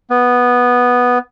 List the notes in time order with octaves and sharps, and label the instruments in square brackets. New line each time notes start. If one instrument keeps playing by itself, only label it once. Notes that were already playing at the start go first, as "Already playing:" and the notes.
[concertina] B3